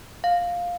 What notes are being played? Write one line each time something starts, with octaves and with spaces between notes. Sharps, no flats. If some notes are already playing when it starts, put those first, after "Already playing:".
F5